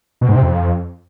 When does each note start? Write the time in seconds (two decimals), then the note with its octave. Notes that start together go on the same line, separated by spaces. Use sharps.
0.21 B2
0.28 G#2
0.36 C3
0.43 F2